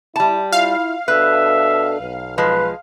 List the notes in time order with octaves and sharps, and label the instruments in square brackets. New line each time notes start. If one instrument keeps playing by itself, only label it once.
[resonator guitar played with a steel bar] G3 A5 [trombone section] E4
[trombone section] E4 F4 [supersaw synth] F5
[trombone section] B2 D4 A4 [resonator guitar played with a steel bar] B4 [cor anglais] E5
[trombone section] B1
[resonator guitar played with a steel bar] F3 G#3 [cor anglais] B4